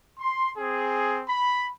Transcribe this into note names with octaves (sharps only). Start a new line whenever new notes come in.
C6
C4 G#4
B5